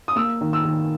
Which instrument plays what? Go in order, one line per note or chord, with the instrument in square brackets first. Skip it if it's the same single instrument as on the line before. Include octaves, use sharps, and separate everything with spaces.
[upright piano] D#6
A#3 E6
D#3
E6
D#3